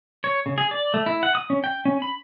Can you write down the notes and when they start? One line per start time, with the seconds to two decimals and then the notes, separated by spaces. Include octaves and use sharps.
0.24 C#5
0.46 C#3
0.58 G#4
0.71 D5
0.94 A3
1.06 E4
1.23 F#5
1.35 D#6
1.50 C#4
1.64 G5
1.85 C#4
2.02 B5